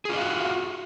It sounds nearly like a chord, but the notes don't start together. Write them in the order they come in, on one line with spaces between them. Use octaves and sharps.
G#4 F4 D#5 F5 F#4